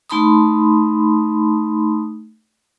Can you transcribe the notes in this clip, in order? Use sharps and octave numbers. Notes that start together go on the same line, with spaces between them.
A3 D#4 A5 B5 C6 D#6